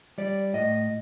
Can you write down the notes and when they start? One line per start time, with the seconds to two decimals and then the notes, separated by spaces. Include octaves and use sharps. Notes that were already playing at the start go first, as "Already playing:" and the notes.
0.18 G3 D5
0.53 A2 D#5